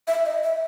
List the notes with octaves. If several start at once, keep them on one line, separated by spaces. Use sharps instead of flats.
E5
D#5
E5